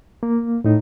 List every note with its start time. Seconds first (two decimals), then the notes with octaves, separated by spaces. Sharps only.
0.23 A#3
0.64 A2 D#4